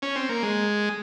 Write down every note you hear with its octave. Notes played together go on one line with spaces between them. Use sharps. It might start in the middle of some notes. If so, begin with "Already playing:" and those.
C#4
C4
A#3
G#3